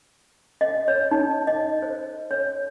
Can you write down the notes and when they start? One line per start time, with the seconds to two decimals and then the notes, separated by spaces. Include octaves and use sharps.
0.61 D#5
0.88 C#5
1.11 D#4
1.47 D#5
1.82 C5
2.31 C#5